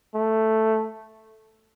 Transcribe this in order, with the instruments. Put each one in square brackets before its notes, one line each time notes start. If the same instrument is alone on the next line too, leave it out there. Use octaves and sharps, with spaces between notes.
[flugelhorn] A3